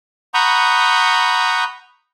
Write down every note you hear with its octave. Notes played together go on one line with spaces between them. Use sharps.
F#5 A#5 B5 C#6 D#6 G6